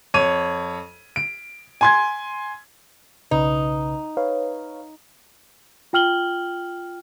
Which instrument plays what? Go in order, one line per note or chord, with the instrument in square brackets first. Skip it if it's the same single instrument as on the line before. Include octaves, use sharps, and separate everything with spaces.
[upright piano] F2 C#5 D#7
D7
G#5 C6 G#6
[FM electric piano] B1 C#3 B4 [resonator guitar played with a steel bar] D#4
[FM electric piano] B4 C#5 F5
[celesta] F4 G5 F6 F#7 G7